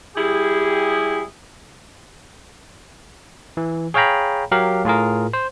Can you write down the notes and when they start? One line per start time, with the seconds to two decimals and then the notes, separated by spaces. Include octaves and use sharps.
0.16 G3 E4 G4 G#4
3.57 E3
3.94 G#4 C#5 F5 G5 A#5 B5
4.52 F#3 G4 A#4 F5
4.85 A2 F4 G#4 A#4
5.33 C5